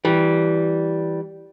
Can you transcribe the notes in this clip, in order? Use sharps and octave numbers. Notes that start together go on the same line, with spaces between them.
E3 G3